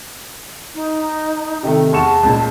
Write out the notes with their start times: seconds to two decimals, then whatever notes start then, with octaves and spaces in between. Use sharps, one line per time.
0.75 D#4
1.63 C3 D#3 A3
1.93 E2 A5 C#6 E7
2.23 C#2 A#2